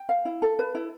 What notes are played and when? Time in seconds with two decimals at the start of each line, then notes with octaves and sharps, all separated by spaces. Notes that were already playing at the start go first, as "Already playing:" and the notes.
Already playing: G5
0.09 F5
0.25 E4
0.42 A4
0.59 B4
0.75 E4